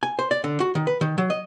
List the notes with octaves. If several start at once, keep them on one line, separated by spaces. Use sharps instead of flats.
G#5
C5
D5
D3
F#4
D#3
B4
D#3
F#3
D#5